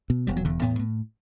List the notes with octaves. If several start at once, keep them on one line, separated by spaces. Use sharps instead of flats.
B2
E1 G3
F#3
E2 D3
A2 B3
A2